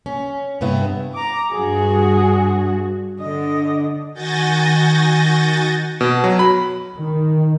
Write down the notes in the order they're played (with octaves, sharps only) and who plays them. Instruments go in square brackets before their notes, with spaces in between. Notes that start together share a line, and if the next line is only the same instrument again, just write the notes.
[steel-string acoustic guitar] C#4
G2 C3 B3 E4
[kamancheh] A#5 D6
[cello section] G2 F#4 [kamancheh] G#4
[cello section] D3 [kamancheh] D#5
[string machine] D#3 F#4 G#5 G6 A6 A#6
[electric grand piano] B2
F#3
B5
[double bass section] D#3